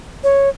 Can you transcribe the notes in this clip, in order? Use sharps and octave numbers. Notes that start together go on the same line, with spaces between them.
C#5